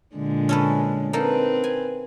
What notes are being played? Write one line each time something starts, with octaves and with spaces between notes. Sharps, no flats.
A#2 D3 G#3
C#4 A4 B4
A#3 C4 D#4 A4 B4
G#5